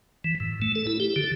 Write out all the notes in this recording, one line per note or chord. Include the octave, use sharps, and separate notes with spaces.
E3
A2
A3
A4
E4
G4
D3